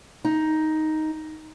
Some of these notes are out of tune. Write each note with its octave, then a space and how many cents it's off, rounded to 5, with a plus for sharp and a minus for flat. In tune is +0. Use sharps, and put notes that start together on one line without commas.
D#4 +5